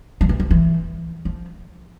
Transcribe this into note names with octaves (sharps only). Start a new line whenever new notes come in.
F3
E3
F3
E3
F3